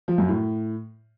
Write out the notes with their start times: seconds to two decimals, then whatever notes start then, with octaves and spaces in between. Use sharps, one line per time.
0.08 F3
0.18 F#2
0.28 A2